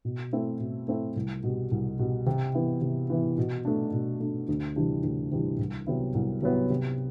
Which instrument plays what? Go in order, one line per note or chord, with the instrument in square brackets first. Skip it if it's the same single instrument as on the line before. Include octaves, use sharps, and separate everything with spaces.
[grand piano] B2
A3 C4 E4
B2
A3 C4 E4
C2
B2 G3
C2
B2 G3
C3
E3 B3 E4
C3
E3 B3 E4
B2
A3 D4
B2
A3 D4
D2
C3 E3 G3 D4
D2
C3 E3 G3 D4
C2
C3 F#3 B3 E4
C2
C3 F#3 B3 E4
C3